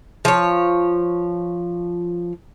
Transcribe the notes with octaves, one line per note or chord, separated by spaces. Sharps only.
F3 C#5